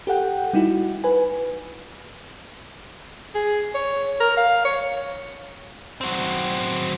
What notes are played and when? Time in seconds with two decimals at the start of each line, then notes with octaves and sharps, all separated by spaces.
0.07 G4 A4 F#5 G5
0.53 G3 D#4 E4 F#4
1.04 B4 G#5
3.35 G#4
3.75 C#5
4.20 A#4
4.37 F5
4.65 C#5
6.01 F#3 C4